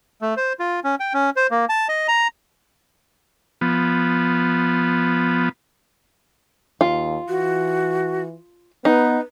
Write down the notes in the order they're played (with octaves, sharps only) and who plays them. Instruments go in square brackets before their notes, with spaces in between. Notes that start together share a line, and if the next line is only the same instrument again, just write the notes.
[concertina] A3
C5
F4
C#4
G5
C#4
C5
A#3
A5
D#5
A#5
[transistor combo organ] F3 B3
[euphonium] D#2 [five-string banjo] F4
[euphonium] E3 [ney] F#4
[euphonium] B3 [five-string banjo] D#4 [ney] B4